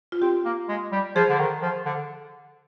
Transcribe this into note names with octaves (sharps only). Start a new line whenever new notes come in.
F4
C4 G4
A#3
G#3
G3
F3 G#4
D3
D#3
F3
D3